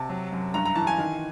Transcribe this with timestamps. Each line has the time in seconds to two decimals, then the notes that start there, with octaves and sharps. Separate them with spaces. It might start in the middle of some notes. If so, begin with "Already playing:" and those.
Already playing: C3 A5
0.09 F#3
0.32 F#2
0.54 G2 A#5
0.65 A#5
0.75 E3 A5
0.87 G#5
0.98 D#3